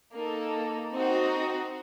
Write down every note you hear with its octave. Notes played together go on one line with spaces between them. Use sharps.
A#3 D#4 A4
C4 D#4 F#4